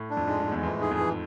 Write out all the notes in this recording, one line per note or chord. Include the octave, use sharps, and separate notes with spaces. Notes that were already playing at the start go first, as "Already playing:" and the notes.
Already playing: A2
D4
F2
G#2 G#3
G#2
G#3
E2
G#2
F2 E3
A2
G#2 G#4
F2
E3